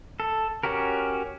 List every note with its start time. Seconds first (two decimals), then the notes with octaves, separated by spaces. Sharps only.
0.20 A4
0.63 C#4 F#4 G4 A#4